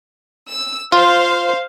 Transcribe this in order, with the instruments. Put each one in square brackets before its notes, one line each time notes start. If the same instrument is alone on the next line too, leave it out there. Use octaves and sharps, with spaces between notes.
[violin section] E6
[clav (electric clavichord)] F4 [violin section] C5 F5